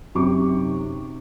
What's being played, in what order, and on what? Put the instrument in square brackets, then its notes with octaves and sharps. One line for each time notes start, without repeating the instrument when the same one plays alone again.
[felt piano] F#2 C3 D#4 C#6 D6